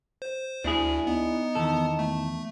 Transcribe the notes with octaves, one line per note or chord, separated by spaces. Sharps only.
C5
D2 D4 E4 G#4
B3 D#4
E2 D#3 A4
A3